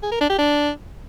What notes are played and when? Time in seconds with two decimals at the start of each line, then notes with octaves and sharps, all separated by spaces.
0.03 G#4
0.12 A#4
0.21 D4
0.30 G4
0.39 D4